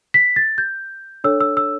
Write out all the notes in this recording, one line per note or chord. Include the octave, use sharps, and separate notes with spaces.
B6
A6
G6
D4 A4 C#5 E6
E6
E6